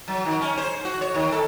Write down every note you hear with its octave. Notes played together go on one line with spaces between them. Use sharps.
F#3
D#3
C#4
C5
F#4
C#5
D#3
A4